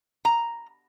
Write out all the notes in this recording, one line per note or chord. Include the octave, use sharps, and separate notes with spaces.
A#5